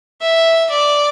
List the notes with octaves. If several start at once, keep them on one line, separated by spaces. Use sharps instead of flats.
E5
D5